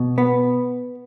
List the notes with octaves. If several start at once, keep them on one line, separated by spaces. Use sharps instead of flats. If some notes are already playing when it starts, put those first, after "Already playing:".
Already playing: B2
B3